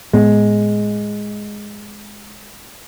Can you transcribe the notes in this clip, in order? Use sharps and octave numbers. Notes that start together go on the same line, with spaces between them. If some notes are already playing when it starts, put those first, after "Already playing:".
A2 G#3 B3